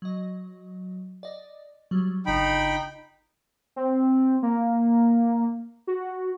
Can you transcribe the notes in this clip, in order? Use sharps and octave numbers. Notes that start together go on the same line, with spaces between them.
F#3 D#5
D5 D#5
F#3 G3
G1 C#3 D#4 G5 B5
C4
A#3
F#4